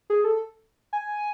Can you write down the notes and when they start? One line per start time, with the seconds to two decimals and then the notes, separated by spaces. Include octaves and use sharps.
0.10 G#4
0.24 A4
0.93 G#5